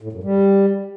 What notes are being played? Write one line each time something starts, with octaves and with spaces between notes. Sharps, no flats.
A2
F#2
G3